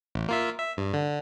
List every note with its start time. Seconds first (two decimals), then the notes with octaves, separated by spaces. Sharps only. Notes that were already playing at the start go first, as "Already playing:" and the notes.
0.15 A1
0.29 A#3 F4 E5
0.59 E5
0.77 G2
0.93 D3